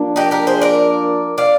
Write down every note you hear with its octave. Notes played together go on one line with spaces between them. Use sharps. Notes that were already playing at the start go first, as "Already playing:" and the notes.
Already playing: F3 A#3 D4
D#4 G4
G4 A#4
G#4 C5
A#4 D5
D5 F5